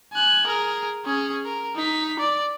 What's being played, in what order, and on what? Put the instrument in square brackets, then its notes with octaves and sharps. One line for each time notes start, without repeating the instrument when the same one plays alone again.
[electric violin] G#5 F#6
G#4 A#4
C#4 G#4
A#4
D#4 B6
D5